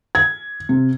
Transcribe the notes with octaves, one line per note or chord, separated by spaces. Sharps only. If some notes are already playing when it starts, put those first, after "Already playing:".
G#6
C3